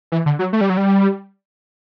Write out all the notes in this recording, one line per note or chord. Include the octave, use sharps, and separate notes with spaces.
E3
D3
F#3
A3
G3
F#3
G3